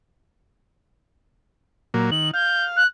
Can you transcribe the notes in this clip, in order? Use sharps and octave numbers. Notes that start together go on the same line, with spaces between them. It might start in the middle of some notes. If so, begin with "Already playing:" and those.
A#2 F#3 A#3
D#3 F#7
F5 G6
F#6